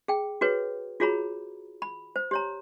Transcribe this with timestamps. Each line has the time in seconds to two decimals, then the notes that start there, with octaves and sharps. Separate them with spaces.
0.08 G#4 G5
0.41 F#4 G#4 B4 C#5
1.00 F4 F#4 G#4 C#5 A#5 B5
1.82 B5
2.16 C5
2.31 G4 C#5 A#5